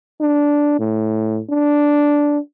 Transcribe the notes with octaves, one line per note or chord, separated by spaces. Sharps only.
D4
A2
D4